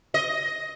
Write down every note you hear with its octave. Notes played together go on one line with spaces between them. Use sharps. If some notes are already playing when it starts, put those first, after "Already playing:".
D#5